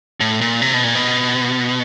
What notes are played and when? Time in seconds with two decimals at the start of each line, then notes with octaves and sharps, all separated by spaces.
0.20 A2
0.41 A#2
0.62 C3
0.73 B2
0.84 A#2
0.95 B2